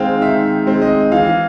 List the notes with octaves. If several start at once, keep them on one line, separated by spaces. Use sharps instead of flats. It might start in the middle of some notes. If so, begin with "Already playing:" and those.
Already playing: D#3 G#3 C4 F5 G5
D#3 E5
G#3 C4
D#5
E3 F5